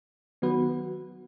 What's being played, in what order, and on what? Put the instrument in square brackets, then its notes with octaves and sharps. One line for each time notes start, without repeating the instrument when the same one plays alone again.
[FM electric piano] D#3 F#3 B3 F#4 B4